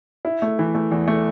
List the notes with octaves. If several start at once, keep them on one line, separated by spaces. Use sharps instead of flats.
E4
A3
E3
A3
E2
A3